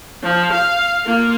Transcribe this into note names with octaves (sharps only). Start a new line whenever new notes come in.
F3
F5
A#3 F4